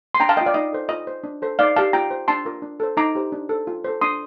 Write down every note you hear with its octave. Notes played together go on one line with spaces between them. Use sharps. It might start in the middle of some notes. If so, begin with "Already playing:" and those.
C6
D4 G5 A#5
F5 A5
F4 A#4 D#5 G5
D5 F5
D#4 D#5
A4 C5
F4 D#5
C5
D4
A4 C5
D#4 D5 F5
G4 A#4 F5 A5
F4 G5 A#5
C5
D4 A5 C6
F4 A#4
D4
A4 C5
D#4 A#5 D6
G4 C5
D4
A4 C5
F4
A4 C5
D4 C6 D#6